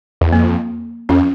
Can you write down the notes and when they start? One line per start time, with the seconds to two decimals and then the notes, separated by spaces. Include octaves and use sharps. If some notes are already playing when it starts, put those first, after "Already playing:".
0.21 E2
0.32 F2 A#3
1.09 F2 C#4